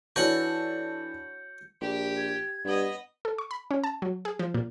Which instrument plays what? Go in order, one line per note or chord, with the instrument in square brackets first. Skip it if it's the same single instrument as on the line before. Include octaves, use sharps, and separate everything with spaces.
[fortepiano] E3 D4 A4 [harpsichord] F#4 C#5 F#5 [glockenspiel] G6 C#7
[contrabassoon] A#1 [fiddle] G4
[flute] G#6
[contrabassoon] G2 [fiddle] B3 D#5
[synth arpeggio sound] A4
C#6
B5
C#4
A5
F#3
G#4
F3
A#2